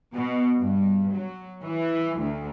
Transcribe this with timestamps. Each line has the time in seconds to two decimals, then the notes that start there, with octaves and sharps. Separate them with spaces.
0.15 B2
0.59 G2
1.12 F#3
1.65 E3
2.21 D2